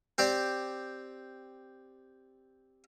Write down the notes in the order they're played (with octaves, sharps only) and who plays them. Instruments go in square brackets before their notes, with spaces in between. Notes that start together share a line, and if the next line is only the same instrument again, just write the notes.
[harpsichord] C4 G4 D5